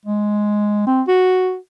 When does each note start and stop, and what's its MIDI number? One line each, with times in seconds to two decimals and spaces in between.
0.05 0.82 56
0.87 1.02 60
1.08 1.57 66